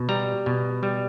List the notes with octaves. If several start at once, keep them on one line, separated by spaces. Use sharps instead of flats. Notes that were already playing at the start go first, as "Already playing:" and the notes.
Already playing: B2
G3 A#5
B2
G3